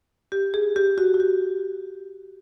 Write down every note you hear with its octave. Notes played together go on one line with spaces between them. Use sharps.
G4
G#4
G4
F#4
F#4
G4